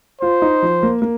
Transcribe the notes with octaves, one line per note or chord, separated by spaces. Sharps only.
F4 C5
D#4
F3
A#3
A#3